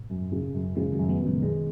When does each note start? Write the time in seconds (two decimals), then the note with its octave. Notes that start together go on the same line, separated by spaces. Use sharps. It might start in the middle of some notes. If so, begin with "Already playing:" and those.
Already playing: G#2 B2
0.10 F#2
0.32 C#3
0.54 F#2
0.76 C#3 F3 G#3
0.93 D#3 F#3
0.99 F#2
1.09 G#3 B3
1.20 F#2
1.26 A#2 C#3
1.42 B2 D#3 G#3